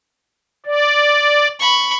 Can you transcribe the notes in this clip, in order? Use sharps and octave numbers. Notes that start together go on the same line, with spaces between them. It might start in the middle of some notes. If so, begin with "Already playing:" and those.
D5
B5 C#6